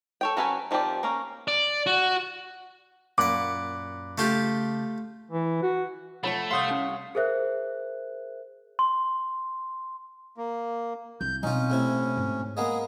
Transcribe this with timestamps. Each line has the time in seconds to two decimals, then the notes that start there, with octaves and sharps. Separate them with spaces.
0.21 A4 C#5 G5
0.37 F#3 C#4 A4 B4 G#5
0.71 D#3 F3 C4 G4 D5
1.03 A#3 C#4 A#5
1.48 D5
1.86 F#4
3.18 F#2 A#2 F#5 B5 D6 F#6
4.18 C#3 A3 F4 G4 A5 G6
5.31 E3
5.63 F#4
6.23 F3 A3 C#5 F#5 A5 B5
6.51 C2 C#5 F5 F#5 C6 D#6 G6 B6
6.71 C#4
7.15 G#4 A#4 C5 E5 F#6
8.79 C6
10.37 A#3
11.21 C2 G6
11.43 B2 C4 C#4 D#4 F4
11.70 A2 C3 E4
12.17 G#2
12.57 G#3 A#3 B3 G#4